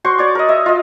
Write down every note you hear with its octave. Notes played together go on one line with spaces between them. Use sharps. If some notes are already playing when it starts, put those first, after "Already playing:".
F#4 C5 C6 C#6
C#5 D5 D6
A#4 D#5
D#5 E5
F4 D#5